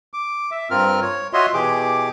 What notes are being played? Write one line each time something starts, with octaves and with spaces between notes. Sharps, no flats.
D6
E5
G2 C4 F4 A#4 F6
C#5
F4 F#4 C#5 D#5 E5 C6
B2 E3 G4 G#4 D6